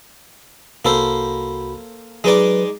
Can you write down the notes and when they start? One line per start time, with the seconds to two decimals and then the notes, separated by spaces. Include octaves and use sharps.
0.85 C2 A#3 F#4 A4 C5 B5
2.24 F#3 G#3 D#4 B4 D5